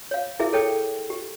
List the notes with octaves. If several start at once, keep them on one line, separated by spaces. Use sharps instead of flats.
C#5 F5
E4 G#4 A#4 E5
G#4 A4 C#5 G5
G4